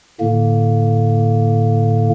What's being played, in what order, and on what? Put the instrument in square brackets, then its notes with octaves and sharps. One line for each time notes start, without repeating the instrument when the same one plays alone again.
[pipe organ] A2 D3 A#3